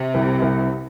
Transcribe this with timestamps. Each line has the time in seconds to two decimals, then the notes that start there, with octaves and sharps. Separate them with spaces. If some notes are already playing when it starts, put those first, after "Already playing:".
Already playing: C3
0.14 C2
0.42 C2